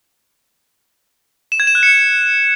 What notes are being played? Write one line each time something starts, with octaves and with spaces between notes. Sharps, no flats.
E7
G#6
E7
F#6
C#7